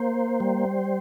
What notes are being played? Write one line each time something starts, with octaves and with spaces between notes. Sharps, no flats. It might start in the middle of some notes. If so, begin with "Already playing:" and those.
Already playing: A#3 C5
G3